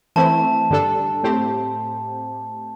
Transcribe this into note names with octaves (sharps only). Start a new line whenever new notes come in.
E3 A3 C4 E4 A5
G2 D3 G3 D4 A4
A2 A3 C4 G4 C5